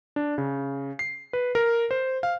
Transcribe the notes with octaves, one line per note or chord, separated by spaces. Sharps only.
D4
C#3
C7
B4
A#4
C5
F5